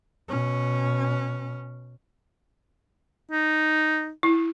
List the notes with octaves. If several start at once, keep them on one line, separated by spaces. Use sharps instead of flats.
B2 C#4
D#4
E4